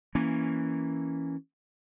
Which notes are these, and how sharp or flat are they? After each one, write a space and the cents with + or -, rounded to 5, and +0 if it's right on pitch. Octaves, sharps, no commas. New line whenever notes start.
E3 +0 A#3 +0 C#4 +0